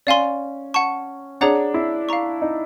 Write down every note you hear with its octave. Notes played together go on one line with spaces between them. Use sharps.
C#4 D5 F5 G#5 C6
F#5 A5 C#6
D4 G#4 C#5 F#5 A#5
E4
F5 A#5 C#6
D#4